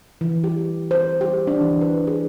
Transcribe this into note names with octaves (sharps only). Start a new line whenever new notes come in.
E3
G4
C5
G4
D4
E3
B4
G#4